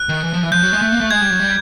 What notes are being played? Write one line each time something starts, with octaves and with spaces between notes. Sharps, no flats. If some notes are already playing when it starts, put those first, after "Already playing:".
Already playing: F#6
D#3
E3
F3
E3
F3 G6
F#3
G#3
A3
A#3
A3
G#3 G#6
G3
F#3
G3